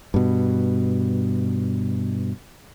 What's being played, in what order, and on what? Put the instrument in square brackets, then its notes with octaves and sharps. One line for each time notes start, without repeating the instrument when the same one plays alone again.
[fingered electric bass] G2 B2